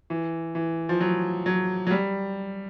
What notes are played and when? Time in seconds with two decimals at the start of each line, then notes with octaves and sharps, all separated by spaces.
0.10 E3
0.55 E3
0.89 F3
1.00 F#3
1.46 F#3
1.87 F#3
1.91 G3